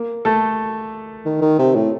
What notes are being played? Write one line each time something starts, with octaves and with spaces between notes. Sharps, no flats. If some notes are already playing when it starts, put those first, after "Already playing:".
Already playing: A#3
A3 A4
D#3
D#3
C3
A2